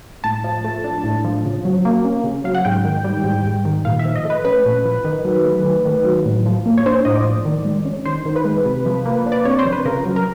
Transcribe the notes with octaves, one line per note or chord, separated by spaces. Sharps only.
A2 A5
F3
A3
D4
A2
F3
C#3
F#3
A#3
C#4
C#3
F#3 F5
F#5
G#2 G5
D#3
G3
G#2
G#2
D#3
A#2 F5
E5
F3
D#5
A3
B4
C#4 B4
A#2
F3
D#3
F#3
A3
D#3
D#3
F#3
A2
F3
A#3
C#5
D4 C5
A2 D#5
D5
F3
D#3
G#3
C#4
D#3 C5
D#3
B4
G#3
C3
F3
A#3
D4
D5
C3 C#5
C5
F3
B4
C#3 A#4
F#3
A#4